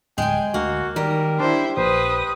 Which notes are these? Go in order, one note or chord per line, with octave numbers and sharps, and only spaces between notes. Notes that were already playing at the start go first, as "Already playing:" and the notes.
D1 G#3 G5 G#5
D2 A#3 F#4
D#3 G3 A#4
D4 E4 C5
A#1 B4 C5 D#6